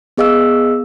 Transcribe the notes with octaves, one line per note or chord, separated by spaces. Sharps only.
B3 G#4 D#5 F5 E6